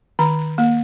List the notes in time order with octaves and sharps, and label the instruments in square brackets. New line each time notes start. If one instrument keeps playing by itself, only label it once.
[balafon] D#3 A#5
A#3